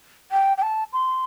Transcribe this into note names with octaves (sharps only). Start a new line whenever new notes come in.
G5
G5
A5
C6